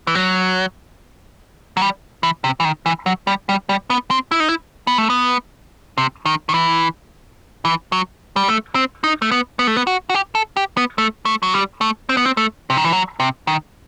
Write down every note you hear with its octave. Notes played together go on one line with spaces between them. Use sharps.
E3
F#3
F#3
G3
E3
C3
E3
D#3
E3
F#3
G3
G3
G3
B3
C4
E4
D#4
E4
B3
A3
B3
C3
D#3
D#3
E3
E3
F#3
G3
A3
C4
D#4
A3
B3
B3
A3
B3
F#4
F#4
G4
A4
G4
B3
A3
A3
F#3
G3
A3
C4
B3
C4
A3
C3
D#3
E3
F#3
C3
D#3